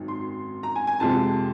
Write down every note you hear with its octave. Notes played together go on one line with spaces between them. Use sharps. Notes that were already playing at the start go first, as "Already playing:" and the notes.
Already playing: G#1 F#2 D#3
C6
A#5
G#5
G#5
F2 C3 F3 G#3 A5